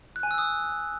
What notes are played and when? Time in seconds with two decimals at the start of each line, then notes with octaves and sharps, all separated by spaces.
0.16 F#6
0.23 G#5
0.31 E6
0.38 D#6